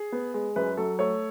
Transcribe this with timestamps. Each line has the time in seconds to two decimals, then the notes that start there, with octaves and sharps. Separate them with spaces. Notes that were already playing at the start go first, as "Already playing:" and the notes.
Already playing: G#4
0.12 B3
0.34 G#3
0.56 F#2 B4
0.77 F#3 A4
0.99 A3 C#5